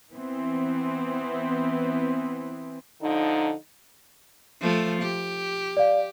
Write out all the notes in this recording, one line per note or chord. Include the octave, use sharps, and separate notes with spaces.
E3 B3 C4
D3 F3 D#4
F3 A3
G4
D5 F5